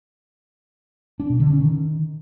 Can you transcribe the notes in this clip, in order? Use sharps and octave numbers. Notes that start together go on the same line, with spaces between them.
D4
B2
D3
C#4
D#3